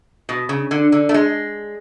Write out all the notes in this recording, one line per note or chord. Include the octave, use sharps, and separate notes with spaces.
B2
C#3
D3
D3
A3
G#3